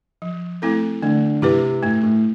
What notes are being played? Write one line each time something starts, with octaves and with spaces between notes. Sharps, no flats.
F3
A3 C4 E4 A4
D3 A3
C3 E4 G4 B4
A2 A3
A2